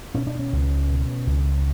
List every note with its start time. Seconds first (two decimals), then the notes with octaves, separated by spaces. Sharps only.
0.14 B2 C#4
0.27 D4
0.39 C#4
0.52 C#2
0.90 B2
1.27 C#2